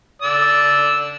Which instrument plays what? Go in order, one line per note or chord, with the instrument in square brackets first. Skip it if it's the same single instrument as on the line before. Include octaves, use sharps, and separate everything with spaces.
[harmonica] D5 E6